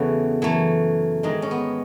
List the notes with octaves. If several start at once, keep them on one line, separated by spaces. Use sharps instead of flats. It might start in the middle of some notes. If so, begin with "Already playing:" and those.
Already playing: E2 C#3 E3 A3 F#4
F#2 E3 A3
G#2 D#3 G#3 D#4
C#4
B3